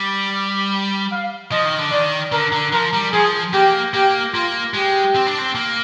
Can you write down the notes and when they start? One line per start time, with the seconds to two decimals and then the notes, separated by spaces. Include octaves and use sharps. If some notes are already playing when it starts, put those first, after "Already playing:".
Already playing: G3
1.12 F5
1.52 F3 D#5
1.66 D#3
1.78 D3
1.91 D#3 D5
2.32 D3 A#4
2.53 D3
2.73 F3 A#4
2.93 G3
3.13 F3 G#4
3.53 A#3 G4
3.94 A#3 G4
4.34 A#3 F4
4.74 G#3 G4
5.15 C4
5.27 D4
5.39 C4
5.55 A#3